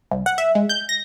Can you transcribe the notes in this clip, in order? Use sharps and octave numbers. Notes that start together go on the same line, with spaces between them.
C2
F#5
E5
G#3
G6
A#6